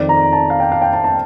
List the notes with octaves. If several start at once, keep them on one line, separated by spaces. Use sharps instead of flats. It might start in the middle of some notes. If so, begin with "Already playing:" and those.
Already playing: F2 D#3 D5
A#5
A5
F5
G5
F5
G5
A5
A5